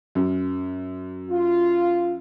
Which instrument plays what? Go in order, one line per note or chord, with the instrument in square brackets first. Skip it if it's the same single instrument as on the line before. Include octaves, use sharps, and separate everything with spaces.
[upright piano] F#2
[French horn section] F4